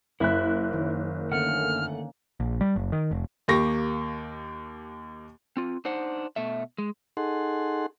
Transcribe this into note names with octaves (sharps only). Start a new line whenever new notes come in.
F#1 E4 E5 F#6
D#3 C#5
D3 A3 A#3 C#4 F#5 F6
A#1
G3
F#1
D#3
F1
D#2 A#3 G4 C#6 A#6
C4 F4
D4 D#4 C5 F#5
B2 A3 E5
G#3
D#4 G#4 A4 F#5 C6